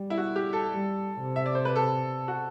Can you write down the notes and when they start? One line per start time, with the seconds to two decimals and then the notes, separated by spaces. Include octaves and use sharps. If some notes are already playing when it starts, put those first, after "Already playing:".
Already playing: G3
0.10 E4
0.18 F#4
0.36 G4
0.53 A4
0.70 G3
1.22 C3
1.36 E5
1.46 D5
1.55 C5
1.65 B4
1.76 A4
2.28 F#4